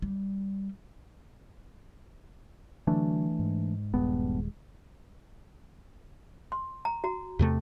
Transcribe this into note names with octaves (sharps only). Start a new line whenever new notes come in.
G3
D3 E3 F#3 A3 D4
G#2
D#1 G2 G#3 B3
C6
A#5
F#4 A#5
E2 C3 A3